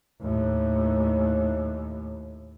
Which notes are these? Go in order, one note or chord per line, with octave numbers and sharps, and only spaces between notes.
D#2 A2